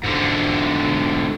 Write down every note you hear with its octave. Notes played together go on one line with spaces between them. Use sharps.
G#2 D3